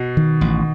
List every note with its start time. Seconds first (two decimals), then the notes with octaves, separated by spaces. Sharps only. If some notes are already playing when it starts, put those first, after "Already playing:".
Already playing: B2
0.17 D#3
0.41 A1